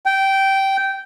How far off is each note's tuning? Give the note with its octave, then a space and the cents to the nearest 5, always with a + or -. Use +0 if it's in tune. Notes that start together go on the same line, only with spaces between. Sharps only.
G5 -15